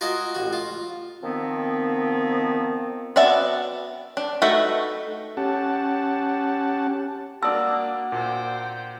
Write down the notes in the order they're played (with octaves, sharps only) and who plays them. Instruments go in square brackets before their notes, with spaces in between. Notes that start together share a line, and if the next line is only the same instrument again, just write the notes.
[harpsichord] F4 F#4 A#4 D#5 G#5
A1 F#4
F4
[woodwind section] D#3 F3 B3 C4
[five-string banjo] B3 F#4 D5 E5 A5
D4
A3 D#4 F#4 B4 E5
[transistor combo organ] C#4 G4 F#5 A5
[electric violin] A#3 D4 [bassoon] F#4 [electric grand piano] D5 A5 [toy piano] D#6 E6
[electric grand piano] A#2 [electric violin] C5 G5